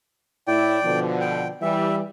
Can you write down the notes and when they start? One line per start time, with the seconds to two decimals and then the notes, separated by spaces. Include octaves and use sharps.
0.47 A2 E4 D5 G5
0.83 B2 D3 F3
1.21 G5
1.62 E3 G3 E5